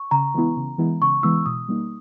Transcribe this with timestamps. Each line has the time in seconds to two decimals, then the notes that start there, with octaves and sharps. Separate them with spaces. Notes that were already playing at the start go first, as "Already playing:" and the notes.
Already playing: C#6
0.11 C#3 A#5
0.34 E3 G#3 B3 E4
0.57 C#3
0.78 E3 G#3 B3 E4
1.01 C#3 C#6
1.23 E3 G#3 B3 E4 E6
1.46 B2 D#6
1.69 G3 A#3 D#4